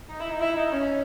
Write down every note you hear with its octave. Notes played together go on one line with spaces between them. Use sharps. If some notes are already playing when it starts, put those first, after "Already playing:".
D#4
E4
D#4
E4
D#4
C#4